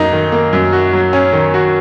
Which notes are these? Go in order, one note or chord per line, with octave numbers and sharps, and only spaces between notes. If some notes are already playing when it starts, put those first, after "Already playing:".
Already playing: F#2 A#3 D#4
D#3
A#3
F#2
F#4
F#3
C#4
D#3
F#4